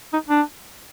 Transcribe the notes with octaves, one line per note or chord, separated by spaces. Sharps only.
D#4
D4